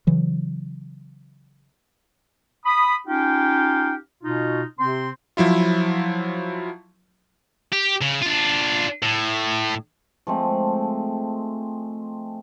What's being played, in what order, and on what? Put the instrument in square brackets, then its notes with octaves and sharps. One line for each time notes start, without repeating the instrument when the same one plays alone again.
[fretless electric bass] C#3 E3 F#3
[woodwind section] B5 D#6
C#4 D#4 F4 G4 F5 G5
B2 D#4 F4
C3 C4 C6
[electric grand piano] F3 F#3 E4 F4
[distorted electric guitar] G4
C#3
D4 F4
A2
[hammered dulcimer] F3 G#3 A3 C4